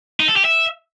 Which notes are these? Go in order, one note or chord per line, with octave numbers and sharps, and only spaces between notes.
D#4
A4
G4
E5